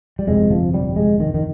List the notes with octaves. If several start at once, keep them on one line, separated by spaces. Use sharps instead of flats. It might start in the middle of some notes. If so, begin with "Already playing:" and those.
G3
G1 F2 C3 G#3
F3
G3
G#3
D#3
D#3